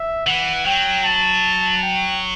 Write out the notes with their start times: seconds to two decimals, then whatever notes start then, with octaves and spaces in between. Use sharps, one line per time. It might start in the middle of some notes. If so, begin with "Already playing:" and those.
Already playing: E5
0.26 E3 F#5
0.66 F#3 G5
1.04 A5
1.82 G5